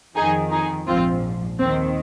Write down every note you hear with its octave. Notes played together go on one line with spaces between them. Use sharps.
F2 D#3 D#4 G#4
D#4 G#4
A#1 G#2 F3 C4 F4
D#2 D#3 C4